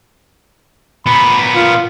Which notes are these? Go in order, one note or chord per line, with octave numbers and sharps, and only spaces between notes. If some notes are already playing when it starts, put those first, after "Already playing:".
A#2 B3 B5
F4